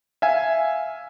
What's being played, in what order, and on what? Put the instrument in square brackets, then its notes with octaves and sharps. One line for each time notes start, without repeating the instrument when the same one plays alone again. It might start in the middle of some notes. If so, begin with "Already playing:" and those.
[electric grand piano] E5 F5 G#5